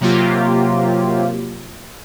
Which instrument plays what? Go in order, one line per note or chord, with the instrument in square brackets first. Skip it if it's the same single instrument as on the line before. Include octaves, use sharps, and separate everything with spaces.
[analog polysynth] C3 F#3 A#3 F4 G4